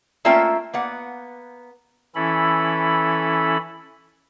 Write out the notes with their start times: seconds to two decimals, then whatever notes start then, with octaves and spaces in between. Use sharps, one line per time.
0.25 A3 A#3 C#4 F4 E5 G5
0.73 A#3 B3 F#5
2.15 E3 C#4 E4 A4 B5